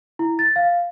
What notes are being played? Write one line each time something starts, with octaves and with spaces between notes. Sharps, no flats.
E4
A6
F5